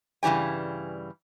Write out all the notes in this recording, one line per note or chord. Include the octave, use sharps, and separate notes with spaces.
G2 C#3 E3 G3 G#5